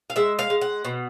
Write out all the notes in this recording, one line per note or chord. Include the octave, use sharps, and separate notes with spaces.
F5
G#3 E5
F5
G#3
F#5
B2